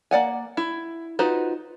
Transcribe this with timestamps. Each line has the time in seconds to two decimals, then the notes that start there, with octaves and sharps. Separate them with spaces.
0.11 A#3 D5 F#5 G#5
0.57 E4
1.19 D#4 F4 F#4 B4 C5